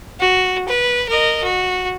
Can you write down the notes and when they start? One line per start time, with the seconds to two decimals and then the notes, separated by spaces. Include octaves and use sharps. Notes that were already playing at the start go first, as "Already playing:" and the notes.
0.20 F#4
0.68 B4
1.09 A#4 D#5
1.44 F#4